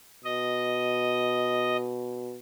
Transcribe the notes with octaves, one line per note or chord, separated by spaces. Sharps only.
B2 D#5